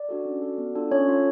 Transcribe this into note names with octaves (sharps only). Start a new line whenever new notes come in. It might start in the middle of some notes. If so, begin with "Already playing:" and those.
Already playing: D5
D4 F#4 A4
C#4
F#4 A4
B3
D4 F4 A4
C#4 C#5
F4 A4